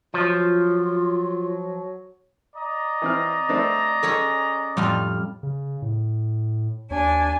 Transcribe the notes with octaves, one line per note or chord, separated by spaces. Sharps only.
F3 F#3 F4
D5 D#5 A#5
E3 C4 F6
A3 C4 D4
G#3 C#4 G#4 A4 C#5
F2 A2 G3 F4 F6
C#3
A2
D#2 D4 G#5